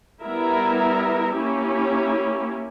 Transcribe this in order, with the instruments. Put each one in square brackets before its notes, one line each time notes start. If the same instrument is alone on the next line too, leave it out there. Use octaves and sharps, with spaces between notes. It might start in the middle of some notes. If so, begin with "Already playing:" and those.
[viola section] G3 B3 E4 A#4 E5
A#3 C#4 E4 G4